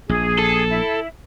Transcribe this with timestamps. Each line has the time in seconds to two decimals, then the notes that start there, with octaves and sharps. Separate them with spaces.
0.09 A#1 G#4
0.39 A4
0.70 E4